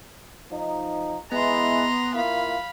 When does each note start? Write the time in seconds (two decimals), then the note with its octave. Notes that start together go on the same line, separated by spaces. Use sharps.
0.51 F3 D#4
1.32 E3 G#3 B3 E4 A#5 C6
2.15 A#3 E4 F4 F5 B5